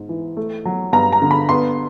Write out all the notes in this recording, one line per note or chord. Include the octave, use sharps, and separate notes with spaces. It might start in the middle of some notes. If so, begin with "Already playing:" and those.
Already playing: G#2
E3
A3
F#3
G2 A#5
A#5
D3
B5
B3 C6